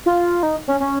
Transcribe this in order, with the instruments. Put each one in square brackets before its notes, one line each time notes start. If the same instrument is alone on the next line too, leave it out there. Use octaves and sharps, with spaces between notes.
[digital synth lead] F4
D#4
C#4
C#4